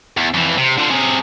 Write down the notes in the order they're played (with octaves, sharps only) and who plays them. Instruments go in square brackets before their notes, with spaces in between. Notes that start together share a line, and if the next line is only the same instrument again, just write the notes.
[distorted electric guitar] E2
F2 E3
C3
D3 F3
C3 G#4